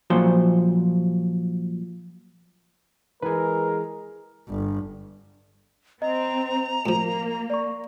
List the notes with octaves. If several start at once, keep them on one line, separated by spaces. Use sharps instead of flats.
A#2 F3 F#3 C5
E3 G#3 G#4 A#4 B4 G#5
G1
C4 D#5 A#5
A2 F3 A#3
D5 C#6